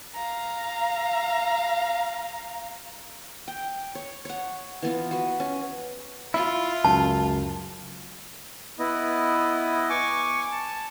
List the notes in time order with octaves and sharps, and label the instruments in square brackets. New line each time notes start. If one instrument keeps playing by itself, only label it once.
[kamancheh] F5 A#5
[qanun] G5
C#5
C#5 F#5
E3 B3 F4
F#4 B4
C#4
[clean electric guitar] E4 [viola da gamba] F4
[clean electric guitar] C#2 [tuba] F#2 [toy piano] A5
[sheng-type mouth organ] B3 E4 D#5
G#5 C#6 D6
A5